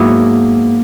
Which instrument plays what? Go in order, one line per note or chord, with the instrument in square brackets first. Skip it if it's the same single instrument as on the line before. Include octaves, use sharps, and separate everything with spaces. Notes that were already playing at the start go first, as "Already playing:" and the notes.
Already playing: [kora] G#2 F#3 B3 E4 [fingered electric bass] A#3